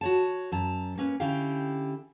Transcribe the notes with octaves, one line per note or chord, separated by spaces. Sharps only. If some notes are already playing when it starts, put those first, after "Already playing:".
F#4 C#5 A5
F#2 A5 A#5
A#3 C#4 B4
D3 C#4 E4 G4 F5 G5